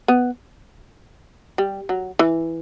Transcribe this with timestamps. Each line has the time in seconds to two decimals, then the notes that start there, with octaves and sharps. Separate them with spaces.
0.08 B3
1.58 G3
1.89 F#3
2.19 E3